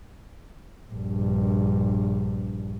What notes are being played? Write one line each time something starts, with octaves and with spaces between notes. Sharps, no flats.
A#1 G2